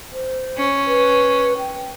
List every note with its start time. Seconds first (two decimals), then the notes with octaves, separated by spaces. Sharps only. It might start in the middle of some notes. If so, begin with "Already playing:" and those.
0.13 C5
0.58 C#4
0.87 B4
1.58 G5